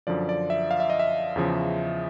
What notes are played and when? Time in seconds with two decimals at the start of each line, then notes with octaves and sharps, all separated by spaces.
0.07 F#2 D3 F3 D5
0.29 D5
0.50 E5
0.71 F5
0.80 E5
0.90 D#5
0.99 E5
1.36 E2 C#3 F3